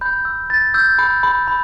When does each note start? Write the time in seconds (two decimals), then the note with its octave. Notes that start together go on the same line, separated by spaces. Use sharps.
0.01 B5 G6
0.25 E6
0.50 B5 A6
0.74 E6 G6
0.98 B5
1.23 B5
1.47 B5